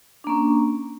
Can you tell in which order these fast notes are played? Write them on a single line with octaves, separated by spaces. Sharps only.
D4 A#3 C#4